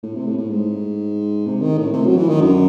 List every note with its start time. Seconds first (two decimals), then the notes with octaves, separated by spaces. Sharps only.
0.03 A2
0.15 C3
0.27 A2
0.38 A2
0.50 G#2
1.46 C3
1.61 D#3
1.78 A2
1.93 C3
2.06 F#3
2.17 E3
2.29 D#3
2.41 F#2